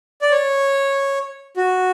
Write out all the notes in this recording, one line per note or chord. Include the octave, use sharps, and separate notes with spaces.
D5
C#5
F#4